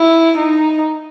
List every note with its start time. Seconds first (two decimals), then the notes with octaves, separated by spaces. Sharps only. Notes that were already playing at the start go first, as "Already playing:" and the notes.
Already playing: E4
0.38 D#4